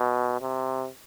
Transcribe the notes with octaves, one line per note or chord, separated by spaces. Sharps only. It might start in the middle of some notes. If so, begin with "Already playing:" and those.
Already playing: B2
C3